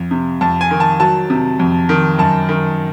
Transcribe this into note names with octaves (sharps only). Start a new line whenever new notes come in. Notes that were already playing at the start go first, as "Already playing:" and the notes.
Already playing: F2
C3
F2 A5
G#5
D#3
A5
F#3 A5
C3
F2
D#3
F#2 A5
D#3